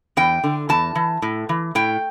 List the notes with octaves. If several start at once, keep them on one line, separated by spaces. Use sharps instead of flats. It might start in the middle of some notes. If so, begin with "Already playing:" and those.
E2 G5
D3
E2 A5
E3
A2
E3
A2 G5